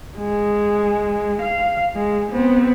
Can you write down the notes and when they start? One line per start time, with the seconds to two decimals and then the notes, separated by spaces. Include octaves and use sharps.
0.18 G#3
1.42 F5
1.95 G#3
2.31 B3 C4